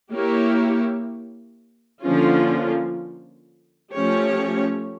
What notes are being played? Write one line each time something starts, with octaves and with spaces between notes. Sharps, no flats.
A#3 E4 G4 C#5
D3 F3 A#3 C#4 F4
F3 A3 C#4 G4 C#5